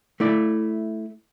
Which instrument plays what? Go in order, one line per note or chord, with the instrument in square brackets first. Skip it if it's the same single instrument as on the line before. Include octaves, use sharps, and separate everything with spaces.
[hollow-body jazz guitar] A3 E4 D5